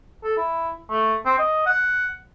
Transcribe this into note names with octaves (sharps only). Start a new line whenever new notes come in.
A4
E4
A3
C4
D#5
F#5